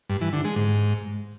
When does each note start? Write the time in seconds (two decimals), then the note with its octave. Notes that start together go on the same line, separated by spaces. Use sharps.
0.09 G2
0.21 E3
0.33 D3
0.45 G#3
0.56 G#2